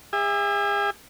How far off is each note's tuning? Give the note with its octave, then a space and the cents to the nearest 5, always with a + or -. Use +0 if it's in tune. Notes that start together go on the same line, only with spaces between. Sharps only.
G#4 -40 E5 +0